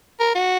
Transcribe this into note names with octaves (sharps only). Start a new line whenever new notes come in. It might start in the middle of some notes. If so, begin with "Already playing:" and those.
A#4
F#4